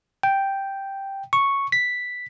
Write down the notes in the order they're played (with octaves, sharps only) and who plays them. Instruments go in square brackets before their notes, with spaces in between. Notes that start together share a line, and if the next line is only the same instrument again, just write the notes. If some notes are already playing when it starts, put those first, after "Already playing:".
[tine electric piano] G5
C#6
B6